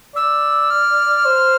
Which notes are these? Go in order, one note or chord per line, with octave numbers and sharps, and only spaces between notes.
D5 E6
F6
C5